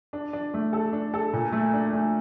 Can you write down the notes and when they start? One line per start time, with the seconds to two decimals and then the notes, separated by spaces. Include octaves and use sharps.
0.13 D4
0.33 D4
0.54 A3
0.73 A4
0.93 D4
1.14 A4
1.33 A#2
1.52 A3
1.73 D4
1.93 A3